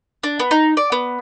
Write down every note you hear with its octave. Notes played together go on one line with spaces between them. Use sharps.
D4
B3
D#4
D5
B3